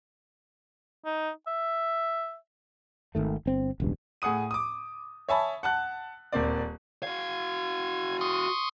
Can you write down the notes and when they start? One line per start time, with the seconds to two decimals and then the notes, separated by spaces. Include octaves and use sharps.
1.05 D#4
1.47 E5
3.15 G#1 D2 D#3 A3
3.46 G1 C4
3.80 E1 C#2 G2
4.22 A2 G#4 F#5 D#6 D#7
4.51 D6 D#6
5.29 C#5 E5 G#5 A5 B5
5.63 F#5 A5 F#6
6.32 D#1 A#3 C4 D5
7.03 F#4 F5 G#6
8.21 C6 C#6 D#6